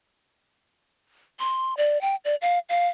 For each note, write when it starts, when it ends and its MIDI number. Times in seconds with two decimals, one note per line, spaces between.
1.40 1.76 84
1.77 2.00 74
2.01 2.16 79
2.25 2.35 74
2.42 2.59 77
2.69 2.88 77